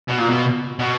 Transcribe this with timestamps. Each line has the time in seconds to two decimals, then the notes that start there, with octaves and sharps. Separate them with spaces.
0.08 B2
0.19 A#2
0.30 B2
0.79 B2